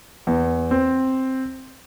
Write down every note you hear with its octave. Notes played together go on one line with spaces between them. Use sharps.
E2
C4